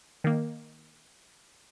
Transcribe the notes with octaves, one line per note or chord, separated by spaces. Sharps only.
D#3 A#3